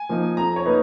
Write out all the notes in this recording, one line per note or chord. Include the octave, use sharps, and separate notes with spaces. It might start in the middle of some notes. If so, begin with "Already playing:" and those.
Already playing: G#5
F3 A#3 D#4
F2 A#5
C#5
A#3 D#4 B4